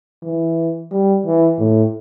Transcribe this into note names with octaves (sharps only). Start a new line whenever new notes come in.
E3
G3
E3
A2